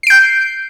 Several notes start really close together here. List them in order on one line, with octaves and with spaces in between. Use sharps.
C7 D7 G6